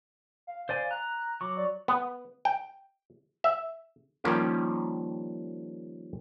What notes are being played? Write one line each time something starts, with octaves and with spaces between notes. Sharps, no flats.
F5
C5 D5 G#5
A#5 F#6
F#3 C#6 D6
D5
B3
G5
E5
D#3 F3 G3 A#3 C#4 G4